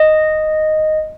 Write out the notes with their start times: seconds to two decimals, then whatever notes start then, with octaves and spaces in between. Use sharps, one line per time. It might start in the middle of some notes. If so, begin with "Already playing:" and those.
Already playing: D#5